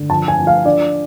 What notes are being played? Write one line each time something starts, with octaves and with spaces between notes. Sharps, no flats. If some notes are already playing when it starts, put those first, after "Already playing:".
Already playing: D3
F3 A5
G#5
F3
F5
D4 D5